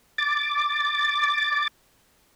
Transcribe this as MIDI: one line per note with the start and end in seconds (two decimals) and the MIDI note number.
0.18 1.68 86
0.18 1.68 93